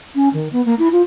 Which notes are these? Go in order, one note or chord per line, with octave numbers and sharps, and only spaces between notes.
C#4
D#3
B3
A#3
E4
F4